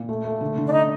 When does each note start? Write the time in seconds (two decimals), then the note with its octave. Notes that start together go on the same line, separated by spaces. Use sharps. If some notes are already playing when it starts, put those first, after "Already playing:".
Already playing: A#2
0.09 A3
0.25 A3
0.41 D3
0.57 D3
0.68 D4
0.73 D#4